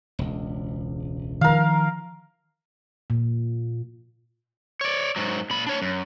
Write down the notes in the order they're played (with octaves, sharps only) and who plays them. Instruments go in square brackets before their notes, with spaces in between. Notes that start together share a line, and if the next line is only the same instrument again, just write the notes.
[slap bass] E1 C#2
[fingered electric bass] D#3 F3 [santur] A#4 F5
[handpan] A#2
[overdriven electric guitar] C#5 D5
G#2 F#3
A#2 B5
D4 C#5
F#2